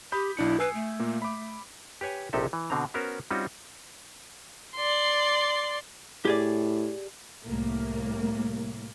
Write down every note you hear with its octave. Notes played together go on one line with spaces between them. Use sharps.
G4 B5 D#6 G6
B1 D4 E4 C#7
B4 G#5 E6 C7
A3
A#2 A#3
B5 D6
G4 B4 C#5 G#5
A#1 C3 D#4 G4 A4 E5
E3
B2 D3 C4 A#5
B3 C#4 F#4 A#4 C5
G3 C4 C#4 D#4 F4 F#4
D5 C6
A2 G4 G#4 D5
C2 A2 A#3